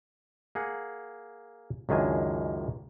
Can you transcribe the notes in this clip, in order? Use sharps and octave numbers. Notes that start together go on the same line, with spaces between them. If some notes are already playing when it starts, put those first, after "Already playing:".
A#3 G#4 F#5
C#2 F#2 D#3 D4 G#5